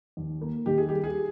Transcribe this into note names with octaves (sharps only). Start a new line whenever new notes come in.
D#2
A#3
D#3 G4
G#4
G3 G4
G#4